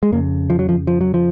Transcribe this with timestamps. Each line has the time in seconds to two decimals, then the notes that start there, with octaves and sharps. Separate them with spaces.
0.03 G#3
0.12 F2 C#3 A#3
0.50 F3
0.59 F#3
0.69 F3
0.87 F3
1.01 F#3
1.14 F3